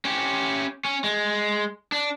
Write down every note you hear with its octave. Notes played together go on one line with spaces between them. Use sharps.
C#4 G4
C#4
G#3
D4